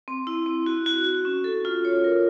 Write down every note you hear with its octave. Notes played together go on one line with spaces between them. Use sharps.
C4
E4
C4
F#4
F#4
F#4
C#4
A4
F4
C#5
A#4